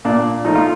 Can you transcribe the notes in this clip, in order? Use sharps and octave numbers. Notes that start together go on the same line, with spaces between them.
A#2 D4
F3 A3 D#4
F4